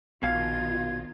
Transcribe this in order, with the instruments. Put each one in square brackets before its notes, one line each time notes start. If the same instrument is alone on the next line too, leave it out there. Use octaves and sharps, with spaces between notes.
[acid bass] A#1 [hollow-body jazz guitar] B2 F5 [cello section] D#3 F4 [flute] G#6